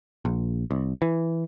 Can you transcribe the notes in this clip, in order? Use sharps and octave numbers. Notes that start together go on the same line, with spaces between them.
A#1
C2
E3